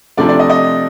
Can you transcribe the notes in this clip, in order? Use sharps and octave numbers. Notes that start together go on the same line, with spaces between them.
C3 F3 A3 D4 D5
D5
D#5
D#5